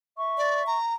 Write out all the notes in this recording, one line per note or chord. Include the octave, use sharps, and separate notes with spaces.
E5 C#6
D5
A#5